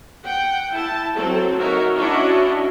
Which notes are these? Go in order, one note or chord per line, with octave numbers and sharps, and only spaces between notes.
F#5 G5
E4 A5
F#3 C4 A4
D#4 F#4 A#4 C#5 E5
C#4 D4 E4 F#4 C#5 D#5